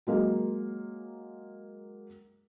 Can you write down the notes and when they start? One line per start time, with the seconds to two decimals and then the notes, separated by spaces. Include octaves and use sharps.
0.07 F#3 G#3 A#3